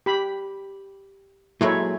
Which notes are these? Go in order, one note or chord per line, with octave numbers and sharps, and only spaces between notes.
G4 B5
A#2 F#3 G#3 E4 A4 C#5